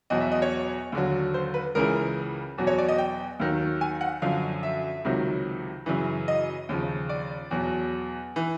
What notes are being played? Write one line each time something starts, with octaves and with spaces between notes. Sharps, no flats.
E2 B2 F#3 D#5
E5
D#5
C#5
D#2 D3 F#3
C5
B4
C#2 C#3 E3 A#4
E2 B2 F#3
C#5
D5
D#5
G5
D#2 D#3 F#3
G#5
F#5
F#2 D3 F3 F5
E5
C#2 C3 D#3 F#3
F#2 C#3 E3
D#5
D#2 C#3 F3
D5
E2 B2 F#3
E3